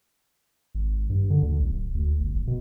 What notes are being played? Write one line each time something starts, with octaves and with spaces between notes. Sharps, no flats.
G#1
G2
D3
D2
B1
D1
D2
G1
F#1
B2